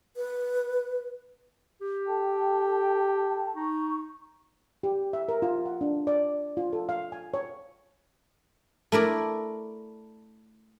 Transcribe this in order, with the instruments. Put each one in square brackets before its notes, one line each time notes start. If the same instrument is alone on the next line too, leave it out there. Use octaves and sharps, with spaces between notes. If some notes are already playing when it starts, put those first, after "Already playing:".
[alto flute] B4
[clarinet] G4
[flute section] A4 G5 A5
[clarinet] D#4 [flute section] C#6
[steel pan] G4
E5
A#4
F4
F#5
D4
D5
F4
A4
F5
G#5
C#5
[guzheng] A3 E4 A#4 D5